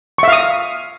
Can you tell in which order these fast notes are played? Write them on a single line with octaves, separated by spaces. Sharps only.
C#6 E5 F5 D#6